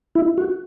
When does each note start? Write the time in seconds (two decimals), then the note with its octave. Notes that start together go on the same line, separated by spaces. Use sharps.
0.15 E4
0.38 F#4